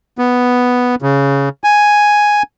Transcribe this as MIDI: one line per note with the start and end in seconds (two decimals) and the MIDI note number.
0.18 0.95 59
1.02 1.49 49
1.64 2.43 80